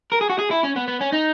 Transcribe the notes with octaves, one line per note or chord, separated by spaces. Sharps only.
A#4
G#4
F#4
G#4
E4
C#4
B3
B3
C#4
D#4